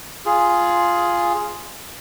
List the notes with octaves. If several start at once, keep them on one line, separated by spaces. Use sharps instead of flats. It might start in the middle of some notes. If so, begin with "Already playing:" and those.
F4 G#4